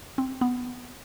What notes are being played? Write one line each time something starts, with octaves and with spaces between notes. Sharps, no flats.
C4
B3